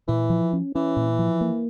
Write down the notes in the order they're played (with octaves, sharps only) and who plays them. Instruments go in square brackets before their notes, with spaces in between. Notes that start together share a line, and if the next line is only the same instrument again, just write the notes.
[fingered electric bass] A#2 [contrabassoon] E3
[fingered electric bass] F3
C#4
[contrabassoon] E3 [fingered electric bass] C#4
[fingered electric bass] A#2
F3
A#3